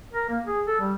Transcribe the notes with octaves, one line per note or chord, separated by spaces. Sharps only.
A#4
A#3
G#4
A4
G3